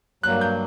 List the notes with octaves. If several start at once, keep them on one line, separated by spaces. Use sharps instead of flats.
G2 F#3 A#3 F#6
G6